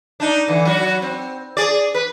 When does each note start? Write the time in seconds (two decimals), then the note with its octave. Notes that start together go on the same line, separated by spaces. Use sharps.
0.20 D4 D#4
0.48 D3 E3
0.65 F#3 F#4
1.02 C4
1.57 G#4 D5
1.94 B4